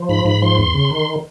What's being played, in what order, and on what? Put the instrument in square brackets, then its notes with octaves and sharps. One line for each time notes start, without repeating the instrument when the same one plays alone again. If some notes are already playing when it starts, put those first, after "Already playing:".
Already playing: [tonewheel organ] F3
G#2 B5
G#2 B5
F3 C6
E2
C#3
D#3